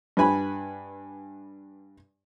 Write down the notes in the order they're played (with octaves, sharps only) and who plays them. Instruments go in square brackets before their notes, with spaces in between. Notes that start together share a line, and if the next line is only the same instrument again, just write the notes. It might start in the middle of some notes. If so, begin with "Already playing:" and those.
[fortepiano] G2 B4 G#5 B5